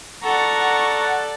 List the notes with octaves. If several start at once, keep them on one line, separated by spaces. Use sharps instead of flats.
A4 D5 F#5 A#5 C#6